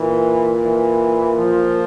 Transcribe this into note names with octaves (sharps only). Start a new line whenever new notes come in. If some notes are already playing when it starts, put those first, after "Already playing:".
Already playing: A#2 E3
E3
F3